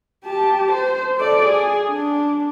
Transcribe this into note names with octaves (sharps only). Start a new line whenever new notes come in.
G4 A5
C5
A4 D5
G#4
D4